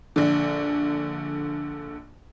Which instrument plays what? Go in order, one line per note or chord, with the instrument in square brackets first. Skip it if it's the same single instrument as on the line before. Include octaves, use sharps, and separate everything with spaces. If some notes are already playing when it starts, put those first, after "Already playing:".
[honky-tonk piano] A#1 D3